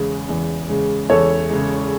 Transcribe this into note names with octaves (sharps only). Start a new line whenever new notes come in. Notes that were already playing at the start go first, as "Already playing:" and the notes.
Already playing: E2 C#3 G#3
E2
C#3 G#3
E2 A4 C#5
C#3 G#3